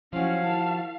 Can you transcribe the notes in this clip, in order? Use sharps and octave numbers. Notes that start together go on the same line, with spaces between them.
F3 F#3 C#4 E4 F#4 F5
D#3 E4 A5